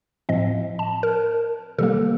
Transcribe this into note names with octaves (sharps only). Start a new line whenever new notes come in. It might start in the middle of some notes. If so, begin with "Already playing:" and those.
A2 F3 C4 D#5
A5
A#4
C3 D#3 G3 A#3 A4